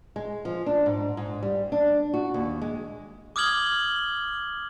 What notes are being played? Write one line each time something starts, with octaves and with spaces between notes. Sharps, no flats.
G#3
F3
D4
G#2
G#2
G3
D4
F#4
D#2
G#3
D6 D#6 F6 G#6 F#7 G7